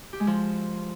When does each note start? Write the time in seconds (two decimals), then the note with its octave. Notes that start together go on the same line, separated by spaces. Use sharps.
0.13 G4
0.20 G#3
0.27 F3